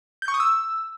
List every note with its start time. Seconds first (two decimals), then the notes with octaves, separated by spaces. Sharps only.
0.22 G6
0.28 C#6
0.34 D#6
0.40 E6